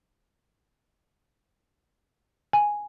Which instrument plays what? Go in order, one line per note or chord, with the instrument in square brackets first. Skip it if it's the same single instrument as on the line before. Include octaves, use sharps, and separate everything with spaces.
[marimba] G#5